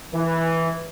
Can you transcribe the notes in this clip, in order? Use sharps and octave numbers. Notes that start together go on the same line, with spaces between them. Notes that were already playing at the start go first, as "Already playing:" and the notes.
E3